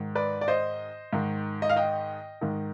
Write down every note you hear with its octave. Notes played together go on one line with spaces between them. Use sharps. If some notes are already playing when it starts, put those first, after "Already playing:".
Already playing: G#2 D#3
B4 D5
D5
C5 D#5
G#2 D#3
D#5
F5
D#5 G5
G#2 D#3